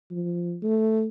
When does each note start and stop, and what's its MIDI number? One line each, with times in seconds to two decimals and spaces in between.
0.11 0.57 53
0.62 1.08 57